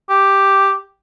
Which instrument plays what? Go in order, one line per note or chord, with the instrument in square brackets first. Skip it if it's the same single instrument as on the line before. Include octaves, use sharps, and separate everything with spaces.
[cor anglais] G4